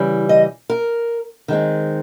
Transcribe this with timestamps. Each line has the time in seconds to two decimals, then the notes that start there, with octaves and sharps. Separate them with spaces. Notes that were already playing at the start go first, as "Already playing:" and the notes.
Already playing: C#3 E3 G3
0.29 D#5
0.70 A#4
1.48 D#3 G#3 C4